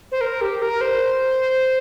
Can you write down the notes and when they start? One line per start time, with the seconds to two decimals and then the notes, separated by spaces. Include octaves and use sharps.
0.12 C5
0.21 A#4
0.41 G4
0.62 A#4
0.81 C5